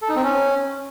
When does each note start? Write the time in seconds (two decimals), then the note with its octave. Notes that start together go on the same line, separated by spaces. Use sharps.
0.02 A4
0.09 D#4
0.16 C4
0.23 C#4